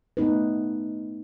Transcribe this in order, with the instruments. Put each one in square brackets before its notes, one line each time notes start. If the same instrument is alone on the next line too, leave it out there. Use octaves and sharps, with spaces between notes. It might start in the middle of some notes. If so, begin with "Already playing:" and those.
[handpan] A3 B3 D#4 B4